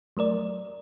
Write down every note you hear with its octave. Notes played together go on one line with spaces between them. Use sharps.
F#3 A3 A#4 D5